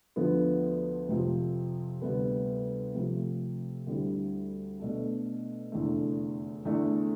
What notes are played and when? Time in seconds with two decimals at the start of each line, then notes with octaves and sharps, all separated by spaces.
0.16 D2 D3 F3 B3
1.09 F2 C3 F3
2.01 D2 C3 G3 B3
2.94 C3 F3 A3 C4
3.87 D2 D3 G3 C4 E4
4.79 B2 A3 D4 A4
5.72 F1 E2 D3 A3
6.65 E2 D3 A3 D4